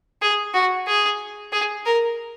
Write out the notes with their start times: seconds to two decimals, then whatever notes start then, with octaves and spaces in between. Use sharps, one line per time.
0.22 G#4
0.54 F#4
0.87 G#4
1.52 G#4
1.86 A#4